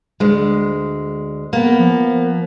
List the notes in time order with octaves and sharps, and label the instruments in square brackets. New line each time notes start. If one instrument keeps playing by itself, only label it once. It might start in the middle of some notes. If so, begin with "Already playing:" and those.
[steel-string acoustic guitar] D2 G#3
A#3 B3
[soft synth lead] F3